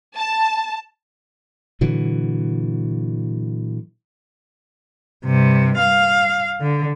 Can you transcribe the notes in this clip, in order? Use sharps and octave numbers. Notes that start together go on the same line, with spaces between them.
A5
A#2 D3 E3 F#3
G2 C3
F5
D3